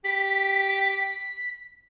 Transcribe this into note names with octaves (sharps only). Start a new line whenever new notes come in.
G4 B6